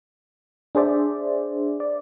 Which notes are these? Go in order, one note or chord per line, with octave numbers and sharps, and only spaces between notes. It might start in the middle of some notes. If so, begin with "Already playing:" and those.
D4 G#4 C5 D5 E5
D5